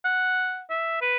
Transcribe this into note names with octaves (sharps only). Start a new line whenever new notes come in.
F#5
E5
B4